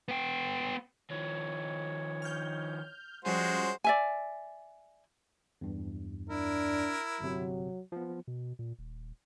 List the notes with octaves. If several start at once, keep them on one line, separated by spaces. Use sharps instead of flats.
B3 G5
D#3 F3 C#5
F6 G6
F3 G3 G#3 C#4 F#4 C5
D5 E5 G#5
E2 G2
D4 E4 A#4
G1 C3 F#3
F3 B3
B2
A#2
D#1